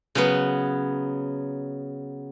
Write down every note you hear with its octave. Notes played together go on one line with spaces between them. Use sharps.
C#3 F#3 B3